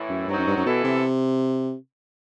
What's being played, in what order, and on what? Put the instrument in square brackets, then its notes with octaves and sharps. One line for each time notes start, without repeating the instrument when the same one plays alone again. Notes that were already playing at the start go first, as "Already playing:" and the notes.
Already playing: [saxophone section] A2 E3 A3 E4
[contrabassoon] F#2
[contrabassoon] G2 [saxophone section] F#3 C4 D#4 F#4
[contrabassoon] F#2
G2
F#2
[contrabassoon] B2 [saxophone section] E3 B3 E4 A4
[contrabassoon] C3